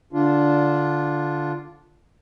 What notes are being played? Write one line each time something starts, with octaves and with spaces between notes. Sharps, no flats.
D3 D4 F4